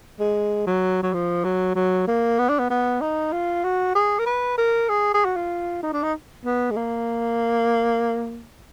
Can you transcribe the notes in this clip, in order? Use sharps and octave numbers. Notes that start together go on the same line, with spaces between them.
G#3
F#3
F#3
F3
F#3
F#3
A#3
B3
D4
B3
B3
D#4
F4
F#4
G#4
A#4
B4
A#4
G#4
G#4
F#4
F4
D#4
D4
D#4
B3
G#3
A#3